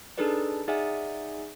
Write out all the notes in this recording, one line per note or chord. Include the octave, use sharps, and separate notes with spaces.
D4 D#4 G#4 A4 B4 D5
D#4 G#4 D5 E5 F#5 G#5